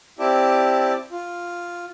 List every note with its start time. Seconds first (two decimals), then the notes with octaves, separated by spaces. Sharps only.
0.19 C4 E4 G4 D5 A5
1.11 F4